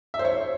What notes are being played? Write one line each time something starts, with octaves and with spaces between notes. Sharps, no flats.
E5
C5
C#5